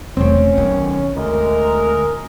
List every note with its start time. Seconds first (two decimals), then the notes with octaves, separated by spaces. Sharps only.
0.17 E1 A3 C4 C#4
0.58 B1 D#3 C4
1.17 D2 G#3 A#4 D#5